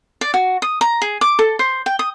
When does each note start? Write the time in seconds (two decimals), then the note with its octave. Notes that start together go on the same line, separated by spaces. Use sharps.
0.21 D5
0.34 F#4
0.62 D#6
0.81 A#5
1.02 G#4
1.21 D6
1.39 A4
1.59 C5
1.86 G5
1.99 D#6